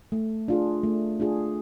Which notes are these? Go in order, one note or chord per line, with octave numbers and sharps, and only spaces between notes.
A3
D4 F4 G#4
A3
D4 F4 G#4